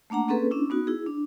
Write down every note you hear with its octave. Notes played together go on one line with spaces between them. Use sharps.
A3 A#3 D4 F#5 A#5
A#3 C4 C#4 G#4 A4 B4
C#4 D4 E4
B3 D#4 F#4
E4 G#4
D4